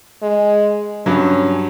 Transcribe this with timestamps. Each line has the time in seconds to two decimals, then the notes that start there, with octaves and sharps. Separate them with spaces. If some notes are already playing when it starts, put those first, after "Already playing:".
0.22 G#3
1.06 G2 F#3 C#4